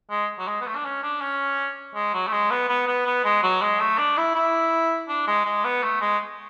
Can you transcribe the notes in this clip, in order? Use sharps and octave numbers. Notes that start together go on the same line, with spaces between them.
G#3
F#3
G#3
B3
A3
D4
C#4
D4
C#4
G#3
F#3
A3
G#3
B3
B3
B3
B3
G#3
F#3
G#3
A3
D4
E4
E4
D4
G#3
G#3
B3
A3
G#3